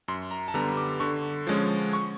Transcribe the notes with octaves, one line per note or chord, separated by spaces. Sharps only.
F#2 C6
A#5
A5
D3 G3 B3 A#5
D6
D3 C#6
F3 G#3 C#4
C#6